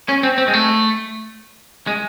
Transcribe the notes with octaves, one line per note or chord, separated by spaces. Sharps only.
C#4
C4
C4
G#3
A3
G#3